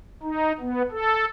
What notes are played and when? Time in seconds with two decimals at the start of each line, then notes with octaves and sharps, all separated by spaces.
0.23 D#4
0.60 B3
0.91 A4